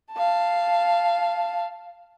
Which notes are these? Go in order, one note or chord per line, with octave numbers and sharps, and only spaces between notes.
F5 A5